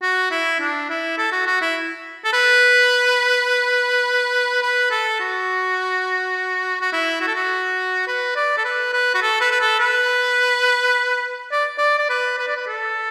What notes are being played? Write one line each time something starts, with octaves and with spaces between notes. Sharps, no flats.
F#4
E4
D4
E4
A4
F#4
F#4
E4
A4
B4
B4
A4
F#4
F#4
E4
F#4
A4
F#4
B4
D5
A4
B4
B4
F#4
A4
B4
B4
A4
B4
D5
D5
D5
B4
B4
D5
B4
A4